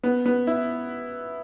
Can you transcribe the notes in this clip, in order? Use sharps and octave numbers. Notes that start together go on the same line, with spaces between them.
B3
B3
E4